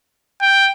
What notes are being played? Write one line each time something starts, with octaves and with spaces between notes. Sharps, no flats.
G5